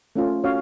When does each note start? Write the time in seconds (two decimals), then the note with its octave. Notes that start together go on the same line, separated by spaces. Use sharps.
0.16 A3 C#4 F4
0.44 C#4 F#4 C#5 F5